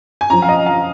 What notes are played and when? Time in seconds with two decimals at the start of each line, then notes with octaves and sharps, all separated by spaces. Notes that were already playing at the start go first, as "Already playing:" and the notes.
0.21 G#5
0.30 F2 F3 C#4 A#5
0.42 F5
0.49 D#5
0.66 F5